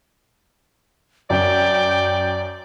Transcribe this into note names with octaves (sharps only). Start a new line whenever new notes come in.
F#2 D5 G5